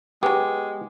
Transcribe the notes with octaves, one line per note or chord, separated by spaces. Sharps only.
F#3 G#3 B3 G4